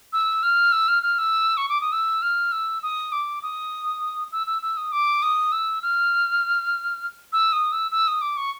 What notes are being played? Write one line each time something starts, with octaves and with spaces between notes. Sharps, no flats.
E6
F6
E6
F6
F6
E6
C#6
D6
D#6
E6
F6
E6
D#6
D6
D#6
E6
E6
E6
D#6
D6
D#6
E6
F6
E6
D#6
E6
E6
D#6
D6
C#6